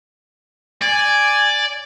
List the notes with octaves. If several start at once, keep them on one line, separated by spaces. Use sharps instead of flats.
D5 G#5